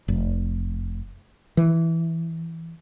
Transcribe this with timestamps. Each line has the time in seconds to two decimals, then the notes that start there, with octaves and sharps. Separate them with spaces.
0.08 F1
1.57 E3